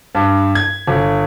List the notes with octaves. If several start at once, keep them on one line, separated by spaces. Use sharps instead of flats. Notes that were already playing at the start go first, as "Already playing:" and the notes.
G2
G#6
G1